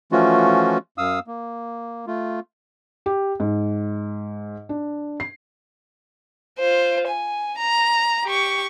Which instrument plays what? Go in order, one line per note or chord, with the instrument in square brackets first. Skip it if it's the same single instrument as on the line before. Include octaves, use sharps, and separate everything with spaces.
[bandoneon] E3 F3 A3 C#4 F4 F#4
F#2 F5 D#6 E6
A#3
A3 F4
[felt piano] G4
G#2
D4
C7
[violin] F4 C5
G#5
A#5
G4 C#6